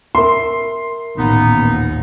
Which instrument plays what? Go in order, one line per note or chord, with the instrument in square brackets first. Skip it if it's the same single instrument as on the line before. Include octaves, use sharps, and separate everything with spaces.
[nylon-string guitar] A#4 E5 [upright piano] C6
[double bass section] A1 D#2 A#2 [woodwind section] B3 D#4